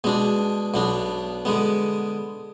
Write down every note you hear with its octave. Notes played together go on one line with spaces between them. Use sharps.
B2 G#3 D4
B1 B2 B3 D4
D3 G#3 B3